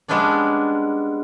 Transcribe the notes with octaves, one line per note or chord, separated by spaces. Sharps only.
G3 G#3 B3 C#4 D4 D5